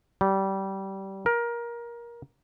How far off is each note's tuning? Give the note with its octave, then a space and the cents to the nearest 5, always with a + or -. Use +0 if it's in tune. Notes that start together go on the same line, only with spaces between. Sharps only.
G3 -20
A#4 +20